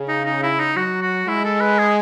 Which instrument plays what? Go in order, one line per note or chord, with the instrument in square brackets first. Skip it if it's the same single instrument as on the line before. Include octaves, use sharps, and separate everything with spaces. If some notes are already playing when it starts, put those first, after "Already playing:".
Already playing: [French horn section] C#3
[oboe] D#4
D#4
E4
D#4
[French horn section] F#3 [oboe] F#4
[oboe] F#4
[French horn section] G#3 [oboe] E4
[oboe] A4
B4
G#4